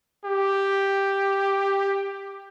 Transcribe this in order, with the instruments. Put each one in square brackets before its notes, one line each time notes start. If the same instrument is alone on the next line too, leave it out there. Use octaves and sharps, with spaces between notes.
[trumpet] G4